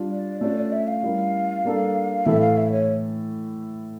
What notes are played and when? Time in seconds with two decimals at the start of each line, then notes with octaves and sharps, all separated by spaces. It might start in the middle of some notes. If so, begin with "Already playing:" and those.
Already playing: G3 D4 F4
0.11 D5
0.41 A3 C#4 F4 A4 D5
0.57 D5
0.72 E5
0.87 F5
1.03 G3 C#4 E4 A#4
1.65 G3 A#3 D4 A4
2.26 A2 E3 A3 E4 A4 E5
2.41 F5
2.57 E5
2.72 C#5